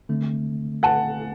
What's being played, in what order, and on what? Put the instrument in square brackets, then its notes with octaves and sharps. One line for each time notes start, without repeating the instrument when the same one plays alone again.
[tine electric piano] D3 A3 C4
[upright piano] F#5 A5